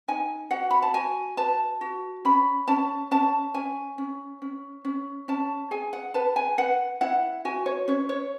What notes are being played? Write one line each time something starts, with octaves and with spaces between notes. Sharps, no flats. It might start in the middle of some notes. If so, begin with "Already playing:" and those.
D#4 G#5
F#4 F#5
B5
A5
F#4 G#5
B4 A5
F#4
C#4 B5
C#4 A5
C#4 A5
C#4 G#5
C#4
C#4
C#4
C#4 A5
G#4 G#5
F#5
B4 A5
G#5
B4 F#5
E4 F#5
F#4 G#5
C#5
C#4 C#5
C#5